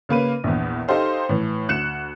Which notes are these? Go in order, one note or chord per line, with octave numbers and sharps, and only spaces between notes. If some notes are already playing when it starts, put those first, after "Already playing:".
C#3 A#3 B4 D#7
A#1 E2
D#4 G4 A4 C5 F5
A2 E3
D2 F#6 C#7 E7